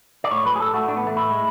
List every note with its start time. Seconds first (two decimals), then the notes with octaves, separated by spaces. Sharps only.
0.24 D5
0.31 A2 C#5
0.45 F#3 B4
0.56 G#4
0.59 A2 A4
0.74 A3 F#4
0.87 A2 D4
0.97 B3
1.02 E3 A3
1.16 A2 E4
1.30 G#3